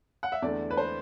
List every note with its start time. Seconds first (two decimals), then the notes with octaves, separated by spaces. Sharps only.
0.23 F#5
0.32 E5
0.42 E2 D3 A3 D5
0.71 B4
0.77 C5